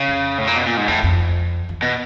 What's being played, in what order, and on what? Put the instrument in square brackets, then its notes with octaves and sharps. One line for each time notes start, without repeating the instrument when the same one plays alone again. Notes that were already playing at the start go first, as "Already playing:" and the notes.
Already playing: [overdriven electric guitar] C#3
[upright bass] F2
[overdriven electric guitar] A2
A#2
B2
A#2
G#2
[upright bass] E2 [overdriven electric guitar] A2
[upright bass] F2
E2
[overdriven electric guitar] B2